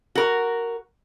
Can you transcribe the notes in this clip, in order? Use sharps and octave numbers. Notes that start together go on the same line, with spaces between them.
F#4 A#4